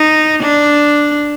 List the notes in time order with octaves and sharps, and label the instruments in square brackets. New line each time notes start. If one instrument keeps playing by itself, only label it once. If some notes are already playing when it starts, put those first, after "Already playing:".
Already playing: [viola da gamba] D#4
D4